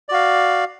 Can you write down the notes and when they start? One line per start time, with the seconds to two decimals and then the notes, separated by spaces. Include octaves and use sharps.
0.09 D5
0.11 F#4
0.14 F5